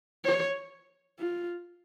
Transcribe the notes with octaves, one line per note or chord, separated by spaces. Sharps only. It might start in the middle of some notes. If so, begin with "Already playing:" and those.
C#5
F4